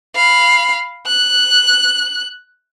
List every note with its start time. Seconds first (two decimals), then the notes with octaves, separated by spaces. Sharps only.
0.15 F5 B5
1.07 F#6